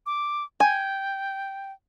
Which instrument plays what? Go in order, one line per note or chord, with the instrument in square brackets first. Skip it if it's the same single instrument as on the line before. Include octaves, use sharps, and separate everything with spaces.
[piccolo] D6
[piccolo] G5 [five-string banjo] G#5